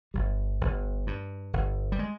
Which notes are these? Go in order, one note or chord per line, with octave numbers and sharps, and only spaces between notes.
G1 G3
G1
G2
G1
G3
G#3